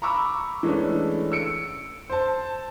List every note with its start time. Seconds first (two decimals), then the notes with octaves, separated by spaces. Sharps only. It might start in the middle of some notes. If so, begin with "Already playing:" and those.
0.02 A#5 B5 C#6 D6 E6
0.63 E3 G#3 A3 C#4 D4
1.32 E6 C#7 D7
2.10 C5 A5